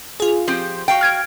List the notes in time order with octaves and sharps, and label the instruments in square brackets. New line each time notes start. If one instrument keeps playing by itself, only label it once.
[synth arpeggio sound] F4 G#4
[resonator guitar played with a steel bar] F3 C4 G4
F#4 F5 G5
[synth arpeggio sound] F6 G#6 D7